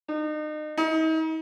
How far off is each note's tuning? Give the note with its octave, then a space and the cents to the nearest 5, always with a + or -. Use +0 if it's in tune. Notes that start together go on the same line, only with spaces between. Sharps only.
D#4 -35
D#4 +40